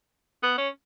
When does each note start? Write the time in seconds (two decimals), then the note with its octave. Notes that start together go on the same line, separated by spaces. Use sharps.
0.43 B3
0.58 C#4